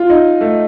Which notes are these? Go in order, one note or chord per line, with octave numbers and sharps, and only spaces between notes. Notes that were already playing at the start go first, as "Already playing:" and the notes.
Already playing: F4
D#4
A3